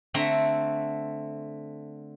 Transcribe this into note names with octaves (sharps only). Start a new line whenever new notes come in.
D3 A3 C4 E5 A#5 C6